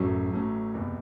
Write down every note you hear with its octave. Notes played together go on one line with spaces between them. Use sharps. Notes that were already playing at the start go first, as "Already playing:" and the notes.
Already playing: A1 F#2 A2 F#3 A3 C#4
A1 A2 F#3 A3 C#4
F#1 E2 C3